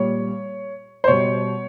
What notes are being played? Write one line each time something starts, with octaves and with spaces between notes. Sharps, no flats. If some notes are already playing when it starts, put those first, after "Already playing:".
Already playing: A#2 G3 C#5
C5
B2 G3 C#5